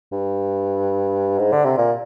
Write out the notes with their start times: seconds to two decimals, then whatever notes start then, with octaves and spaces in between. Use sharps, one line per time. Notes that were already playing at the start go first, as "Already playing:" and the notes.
0.12 G2
1.39 G#2
1.52 D3
1.65 C3
1.78 A#2